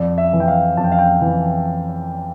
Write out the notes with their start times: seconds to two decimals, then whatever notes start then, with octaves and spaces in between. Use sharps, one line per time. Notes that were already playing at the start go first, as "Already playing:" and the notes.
Already playing: F2 D5
0.18 E5
0.33 E3
0.40 G5
0.48 F5
0.77 F2 A5
0.84 G5
0.92 F5
0.99 G5
1.22 E3